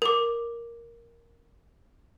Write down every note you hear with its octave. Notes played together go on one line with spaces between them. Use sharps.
A#4 D6